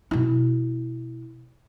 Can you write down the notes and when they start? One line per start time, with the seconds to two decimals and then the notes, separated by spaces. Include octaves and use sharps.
0.11 B2 E4